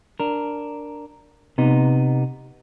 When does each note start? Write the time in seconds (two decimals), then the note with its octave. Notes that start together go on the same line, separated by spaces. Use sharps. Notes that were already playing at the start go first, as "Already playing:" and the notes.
0.20 D4 A#4
1.58 C3 B3 D#4